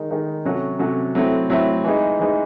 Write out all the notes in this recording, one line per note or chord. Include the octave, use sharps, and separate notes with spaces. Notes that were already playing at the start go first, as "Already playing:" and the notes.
Already playing: D#3 G#3 D#4
D#3 G#3 D#4
C3 F#3 C#4 F#4 A4
C3 F#3 C#4 F#4 A4
F#3 A3 C4 E4 A4
F#3 A3 C4 E4 A4
E3 G#3 D#4
E3 G#3 D#4